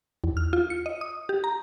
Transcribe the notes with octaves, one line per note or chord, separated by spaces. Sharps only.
E2
F6
F4
C#7
D#5
D#6
G4
A#5